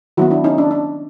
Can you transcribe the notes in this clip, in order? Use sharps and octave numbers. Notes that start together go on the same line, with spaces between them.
D#3 F#3 B3 E4 F#4
D4 E4
C#4 D#4
D4
D4